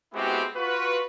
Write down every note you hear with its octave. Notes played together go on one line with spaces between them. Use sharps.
G#3 B3 C4 E4 F#4 G4
F4 F#4 B4